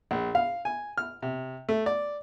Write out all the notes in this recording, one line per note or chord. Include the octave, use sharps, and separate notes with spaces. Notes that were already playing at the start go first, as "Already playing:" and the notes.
A#1
F5
G#5
F6
C3
A3
D5